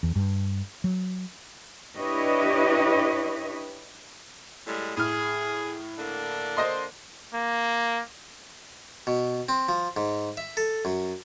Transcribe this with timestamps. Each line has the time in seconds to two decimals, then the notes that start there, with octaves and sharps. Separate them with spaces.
0.03 E2
0.16 G2
0.84 F#3
1.98 D4 E4 G4 B4 C#5 D#5
4.67 A2 G3 G#3
4.97 A2 G#4 F6
5.99 D3 A#3 D4
6.57 C5 D#5 C6
7.35 A#3
9.07 B2
9.49 C4
9.69 F3
9.97 G#2
10.37 E5
10.57 A4
10.85 F#2